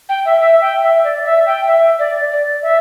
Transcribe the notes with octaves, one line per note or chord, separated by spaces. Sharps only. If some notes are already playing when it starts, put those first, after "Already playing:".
G5
E5
E5
G5
E5
D5
E5
G5
E5
D5
D5
E5